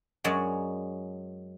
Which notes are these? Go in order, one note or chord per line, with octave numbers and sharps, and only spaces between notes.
F#2 F#3 G#3 C#5 D5